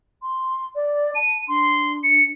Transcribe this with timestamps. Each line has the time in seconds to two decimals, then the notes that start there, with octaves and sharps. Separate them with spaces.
0.22 C6
0.75 D5
1.15 A5 D#7
1.48 D4 C6
2.04 C#7